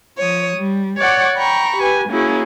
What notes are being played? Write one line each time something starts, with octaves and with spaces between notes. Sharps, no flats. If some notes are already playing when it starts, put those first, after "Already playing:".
F3 C#5 D#6
G3
C#5 D5 F#5 C#6 D6
G5 A#5 B5 C#6
G4 B4 G#5
A#3 C#4 E4 F#4 G#4